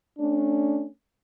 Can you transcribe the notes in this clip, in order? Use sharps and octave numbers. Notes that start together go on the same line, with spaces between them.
A3 C#4 D4